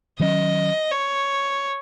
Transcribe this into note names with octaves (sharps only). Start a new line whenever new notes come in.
D#3 F#3 C#4 D#5
C#5